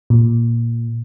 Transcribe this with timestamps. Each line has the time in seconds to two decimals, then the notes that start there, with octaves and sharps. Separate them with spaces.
0.10 A#2